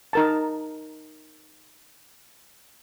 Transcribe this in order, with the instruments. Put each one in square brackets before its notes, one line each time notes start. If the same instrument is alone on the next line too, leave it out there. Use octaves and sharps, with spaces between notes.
[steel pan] D#4 A#4 A5